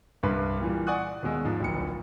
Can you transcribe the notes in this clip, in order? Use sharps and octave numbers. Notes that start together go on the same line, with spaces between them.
C2 G2 B4 C6
A#2 E3 G3
D5 F#5 G#5 C#6 D#6 F#6
D#2 B2 G#3 E6
G#2 F3
D1 A#1 C#7